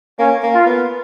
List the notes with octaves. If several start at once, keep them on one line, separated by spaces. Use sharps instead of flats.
A#3 C#4
A#3
F4
B3